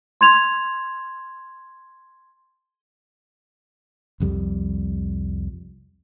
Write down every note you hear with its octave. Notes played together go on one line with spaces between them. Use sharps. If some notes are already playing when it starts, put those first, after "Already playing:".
C6 G#6 F7
C2 F2 G3